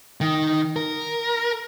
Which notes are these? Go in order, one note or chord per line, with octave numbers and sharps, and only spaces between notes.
D#3
A#4